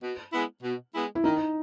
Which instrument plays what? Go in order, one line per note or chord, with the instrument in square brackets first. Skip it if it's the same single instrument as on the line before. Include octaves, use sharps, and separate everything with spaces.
[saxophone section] B2
G#3 B3 E4
B2
G#3 B3 E4
[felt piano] E4
[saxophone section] D#3 [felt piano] D#4